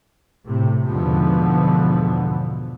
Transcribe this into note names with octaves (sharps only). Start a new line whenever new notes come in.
A2 C3
E2 G#2 B2 D3 F3 B3